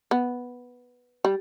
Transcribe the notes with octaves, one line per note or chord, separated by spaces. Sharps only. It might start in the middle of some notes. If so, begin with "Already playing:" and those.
B3
G3